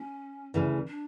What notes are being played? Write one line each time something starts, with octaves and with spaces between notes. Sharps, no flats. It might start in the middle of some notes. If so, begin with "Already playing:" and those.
Already playing: C#4
D2 C#3 E3
D4